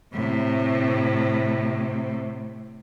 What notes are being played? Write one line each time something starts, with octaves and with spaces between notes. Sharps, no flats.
A2 C3